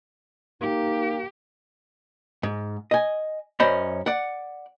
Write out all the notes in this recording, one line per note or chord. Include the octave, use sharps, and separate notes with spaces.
A#3 D#4 G4
G#2
D#5 G#5
F#2 C#4 C5 D5 D#5 B5
D5 F#5